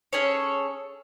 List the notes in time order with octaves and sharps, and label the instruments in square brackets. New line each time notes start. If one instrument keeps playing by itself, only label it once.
[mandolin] C#4 G#4 A4 C#5